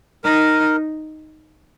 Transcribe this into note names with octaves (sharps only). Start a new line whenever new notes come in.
D#4 A#4